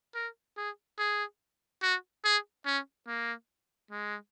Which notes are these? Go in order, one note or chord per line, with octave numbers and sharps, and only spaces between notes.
A#4
G#4
G#4
F#4
G#4
C#4
A#3
G#3